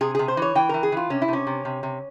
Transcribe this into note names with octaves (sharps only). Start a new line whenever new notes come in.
C3 G#4
C3 G#4
C5
E3 C#5
E3 G5
E3 A#4
G#4
E3 F4
C3 C#4
E4
C3 C#4
C3
C3
C3